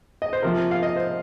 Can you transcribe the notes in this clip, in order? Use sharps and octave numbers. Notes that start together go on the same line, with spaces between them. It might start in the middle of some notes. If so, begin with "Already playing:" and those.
D#5
C5
C3 F3 A#3 A#4
F5
D#5
C5